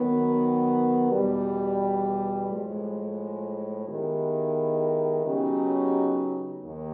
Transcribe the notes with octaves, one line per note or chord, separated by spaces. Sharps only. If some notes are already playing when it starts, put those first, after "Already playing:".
Already playing: D#3 F#3 B3
E2 B2 G3
A2 F3 G#3
D#3 G#3 B3 E4 G4
C#3 F#3 B3 D#4 G4
D#2